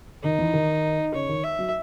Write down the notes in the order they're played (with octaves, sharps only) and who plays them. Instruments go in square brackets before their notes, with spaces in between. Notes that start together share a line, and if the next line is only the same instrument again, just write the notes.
[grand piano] D#3 [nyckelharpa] D#4
[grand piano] E3
D#3
[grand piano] C#3 [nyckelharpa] C#5
[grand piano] D#3
[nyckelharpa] E5
[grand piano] F#3